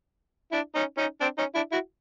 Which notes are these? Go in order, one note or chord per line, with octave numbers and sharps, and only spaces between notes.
D4 E4
C#4 D#4
C#4 D#4
C4 D4
C#4 D#4
D4 E4
E4 F#4